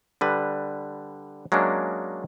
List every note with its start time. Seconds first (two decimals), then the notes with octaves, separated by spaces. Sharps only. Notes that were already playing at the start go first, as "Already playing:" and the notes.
0.21 D3 G3 B4
1.52 F#3 G#3 A#3 C#4 D4